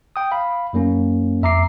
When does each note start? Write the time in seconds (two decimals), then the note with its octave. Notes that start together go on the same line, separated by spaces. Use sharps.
0.16 G5 D#6
0.32 F5 B5
0.73 F#2 F#3 A#3 C#4
1.42 F2 E5 A#5 D6 C7